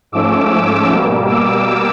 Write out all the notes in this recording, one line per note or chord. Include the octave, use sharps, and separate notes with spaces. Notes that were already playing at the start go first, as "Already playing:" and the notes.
G#2 F3 A3 C#4 D6 E6
D6 E6
B2 G3 A#3
D6 E6